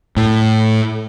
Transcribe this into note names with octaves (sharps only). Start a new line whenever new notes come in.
A2